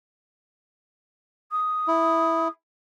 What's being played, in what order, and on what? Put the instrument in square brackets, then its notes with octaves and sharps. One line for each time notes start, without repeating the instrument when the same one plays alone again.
[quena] D#6
[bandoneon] E4